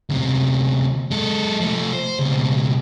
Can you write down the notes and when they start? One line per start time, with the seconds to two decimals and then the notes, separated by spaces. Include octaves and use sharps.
0.10 D2 C3
1.11 G#3 A4
1.60 F3 A3
1.93 C5
2.19 C#2 B2